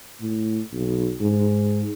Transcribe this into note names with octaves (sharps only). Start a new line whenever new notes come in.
A2
B1
G#2